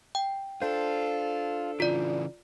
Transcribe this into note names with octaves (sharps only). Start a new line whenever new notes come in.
G5
D4 F4 A4 C5
C#3 E3 F4 D5